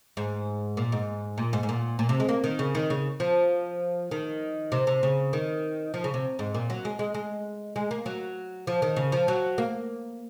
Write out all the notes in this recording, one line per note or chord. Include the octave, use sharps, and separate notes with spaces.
G#2
A#2
G#2
A#2
G#2
G#2
A#2
A#2
C3
G#3
A#3
D#3
C#3
D#3
C#3
F3
D#3
C3
C3
C#3
D#3
F3
C#3
C3
G#2
A#2
F#3
G#3
G#3
G#3
G#3
A#3
F#3
F3
D#3
C#3
F3
F#3
A#3